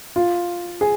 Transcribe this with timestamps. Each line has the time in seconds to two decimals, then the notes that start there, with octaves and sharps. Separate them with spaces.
0.16 F4
0.81 G#4